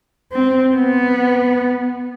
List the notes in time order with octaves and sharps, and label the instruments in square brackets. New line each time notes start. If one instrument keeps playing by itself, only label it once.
[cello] C4
B3